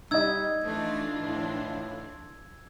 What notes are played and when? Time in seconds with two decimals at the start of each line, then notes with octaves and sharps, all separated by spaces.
0.11 G3 D#4 D#5 E6 G#6
0.64 E3 A3 D4 F4
1.21 A2